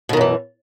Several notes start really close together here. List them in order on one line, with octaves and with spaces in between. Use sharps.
B2 D#3 F#2 E3